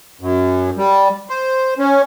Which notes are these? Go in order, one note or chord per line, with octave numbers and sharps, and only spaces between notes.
F#2
G3
C5
C#4